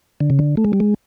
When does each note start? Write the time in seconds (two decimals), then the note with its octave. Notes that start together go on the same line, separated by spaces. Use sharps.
0.20 D3
0.30 C#3
0.39 D3
0.57 A3
0.65 G#3
0.73 G3
0.80 G#3